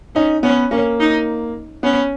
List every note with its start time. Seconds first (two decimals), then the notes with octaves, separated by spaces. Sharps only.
0.15 C#4 D#4
0.43 B3 C#4
0.71 A#3 C#4
1.00 D#4
1.83 B3 C#4